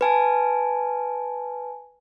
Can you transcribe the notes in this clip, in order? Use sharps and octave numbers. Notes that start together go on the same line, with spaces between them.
B4 G#5 A5